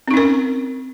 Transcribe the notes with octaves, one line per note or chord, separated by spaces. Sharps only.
C4 C#4 D#4 A#4